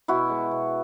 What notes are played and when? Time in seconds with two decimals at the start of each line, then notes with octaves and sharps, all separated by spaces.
0.08 B2 E4 F#4
0.29 G#3
0.51 B2